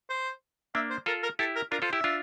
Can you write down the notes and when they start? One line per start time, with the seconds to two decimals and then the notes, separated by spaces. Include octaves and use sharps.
0.10 C5
0.75 A#3 D4 E5
0.91 C5
1.06 F4 A4 A#4
1.23 A#4
1.39 E4 G4 A4
1.56 A#4
1.72 D4 F4 A#4
1.82 F4 A4 C5
1.93 E4 G4 E5
2.04 D4 F4